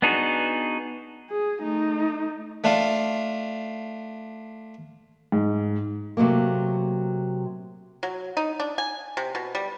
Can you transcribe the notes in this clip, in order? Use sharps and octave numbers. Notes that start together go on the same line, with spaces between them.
B3 D4 D#4 F#4 G#4
G#4
A3 D#4
A3 D4 F4 F5
G#2
C3 F#3 A3 A#3
F#3
D#4
D4
G#5
C3
B2
G3